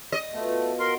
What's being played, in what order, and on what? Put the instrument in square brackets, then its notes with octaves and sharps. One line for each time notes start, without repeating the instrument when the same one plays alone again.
[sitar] D#5
[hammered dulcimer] B2 F4 [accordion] A3
[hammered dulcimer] F#4 [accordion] A#4 C6